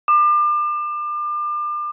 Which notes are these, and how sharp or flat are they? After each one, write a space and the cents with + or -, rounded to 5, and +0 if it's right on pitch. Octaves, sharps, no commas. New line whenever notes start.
D6 +35